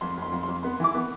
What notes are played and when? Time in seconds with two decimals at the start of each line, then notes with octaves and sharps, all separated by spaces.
0.01 F2 C6
0.18 F2 C6
0.32 F2
0.43 C6
0.48 F2
0.63 B3 C6
0.80 E3 D6
0.95 B3